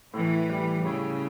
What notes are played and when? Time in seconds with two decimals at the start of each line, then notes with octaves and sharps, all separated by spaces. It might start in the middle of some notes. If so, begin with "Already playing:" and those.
0.14 A2 E3
0.50 G3
0.86 C#3 E4